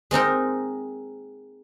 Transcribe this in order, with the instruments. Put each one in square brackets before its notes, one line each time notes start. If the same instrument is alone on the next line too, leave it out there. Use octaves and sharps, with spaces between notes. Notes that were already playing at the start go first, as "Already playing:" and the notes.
[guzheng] G#3 C4 D#4 A#4